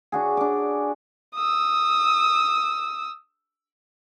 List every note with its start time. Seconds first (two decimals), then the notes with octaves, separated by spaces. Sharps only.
0.12 D4 F#4 G#4
0.37 D4 D6
1.36 D#6 E6